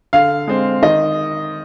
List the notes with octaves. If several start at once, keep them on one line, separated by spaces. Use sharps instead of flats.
D3 F5
G#3 C4
D#3 D#5